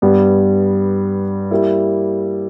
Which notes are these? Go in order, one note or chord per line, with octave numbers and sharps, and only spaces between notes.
G2 G3 B3
G3 A#3 E4